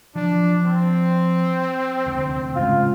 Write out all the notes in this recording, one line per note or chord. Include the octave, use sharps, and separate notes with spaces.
F3 D4
C4
F1 D2
D1 G#2 C#3 F4